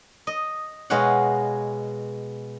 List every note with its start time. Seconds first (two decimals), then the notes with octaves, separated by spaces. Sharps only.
0.27 D#5
0.90 B2 G#3 C#5 F5 F#5